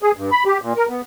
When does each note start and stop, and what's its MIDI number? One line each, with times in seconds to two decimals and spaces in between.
0.03 0.12 68
0.17 0.30 43
0.31 0.44 83
0.45 0.58 67
0.62 0.73 46
0.77 0.86 70
0.89 1.01 59